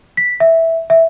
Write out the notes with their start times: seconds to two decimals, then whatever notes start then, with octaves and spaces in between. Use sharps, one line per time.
0.17 B6
0.40 E5
0.90 E5